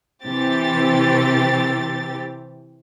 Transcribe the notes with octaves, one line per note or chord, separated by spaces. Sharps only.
C3 E3 C4 G4 A6